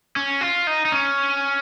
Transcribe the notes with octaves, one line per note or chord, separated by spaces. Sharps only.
C#4
F4
D#4
D#4
C#4